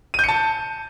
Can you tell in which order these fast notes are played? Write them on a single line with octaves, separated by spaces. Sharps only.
D#7 G6 C#7 A5